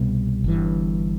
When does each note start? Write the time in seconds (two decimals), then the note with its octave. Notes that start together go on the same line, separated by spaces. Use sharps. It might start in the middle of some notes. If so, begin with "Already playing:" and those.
Already playing: C2 B2 G3 B3
0.44 G1 G2 E3